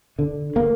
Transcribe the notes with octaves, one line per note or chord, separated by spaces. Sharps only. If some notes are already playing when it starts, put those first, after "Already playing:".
D3
A#3